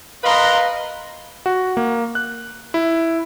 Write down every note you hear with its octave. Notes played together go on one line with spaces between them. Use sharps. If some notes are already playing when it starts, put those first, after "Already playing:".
A#4 B4 D#5 F5 A#5 C6
F#4
A#3
F#6
E4